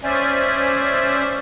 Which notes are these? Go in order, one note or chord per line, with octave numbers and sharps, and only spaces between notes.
C#4 C5 D5 E5 G#5